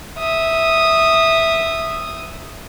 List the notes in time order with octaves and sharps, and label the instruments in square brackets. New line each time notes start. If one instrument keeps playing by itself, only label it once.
[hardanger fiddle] E5 D#6